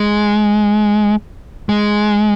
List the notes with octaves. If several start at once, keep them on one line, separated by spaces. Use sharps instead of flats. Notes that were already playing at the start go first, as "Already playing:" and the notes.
Already playing: G#3
G#3